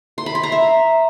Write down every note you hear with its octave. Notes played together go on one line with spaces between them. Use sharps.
C6
B5
C6
A#5
E5